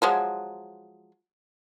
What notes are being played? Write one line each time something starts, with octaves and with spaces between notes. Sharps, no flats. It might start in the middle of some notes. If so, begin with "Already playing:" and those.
F3 F#3 G#3